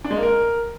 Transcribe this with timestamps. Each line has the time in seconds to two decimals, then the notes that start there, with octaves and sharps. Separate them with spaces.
0.04 D4
0.11 G#3
0.17 A#3
0.23 A#4